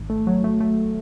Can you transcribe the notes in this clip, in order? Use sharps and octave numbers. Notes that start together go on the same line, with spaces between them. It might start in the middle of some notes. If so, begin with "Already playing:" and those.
Already playing: G#1
A3
F#3
A3
A3